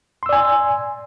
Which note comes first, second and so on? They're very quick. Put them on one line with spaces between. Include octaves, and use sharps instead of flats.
C6 E6 D5 G#5